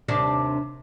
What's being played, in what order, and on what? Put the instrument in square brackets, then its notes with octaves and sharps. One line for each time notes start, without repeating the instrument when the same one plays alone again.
[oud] D#2 C3 D4